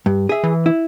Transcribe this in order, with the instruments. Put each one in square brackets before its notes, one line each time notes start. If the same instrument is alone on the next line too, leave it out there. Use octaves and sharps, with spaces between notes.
[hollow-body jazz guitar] G2
G#4 E5
[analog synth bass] E3
[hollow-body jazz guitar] E4